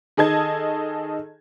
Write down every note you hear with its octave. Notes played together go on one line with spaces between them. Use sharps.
D#3 G#4 A4 D#5 A5 G#6